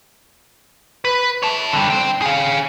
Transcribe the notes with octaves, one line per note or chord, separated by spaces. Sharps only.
B4
C#5 A5
D3 G3
C5 G5
G#4 F5